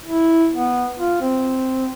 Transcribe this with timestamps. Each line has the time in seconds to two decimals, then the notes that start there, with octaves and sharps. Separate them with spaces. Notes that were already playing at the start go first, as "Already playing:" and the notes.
0.05 E4
0.52 B3
0.99 F4
1.21 C4